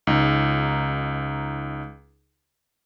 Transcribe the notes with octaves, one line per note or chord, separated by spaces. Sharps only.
C#2 D#4